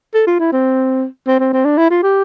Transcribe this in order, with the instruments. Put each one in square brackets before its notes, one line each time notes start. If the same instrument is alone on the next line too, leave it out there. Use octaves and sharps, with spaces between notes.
[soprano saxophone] A4
F4
E4
C4
C4
C4
C4
D4
E4
F4
G4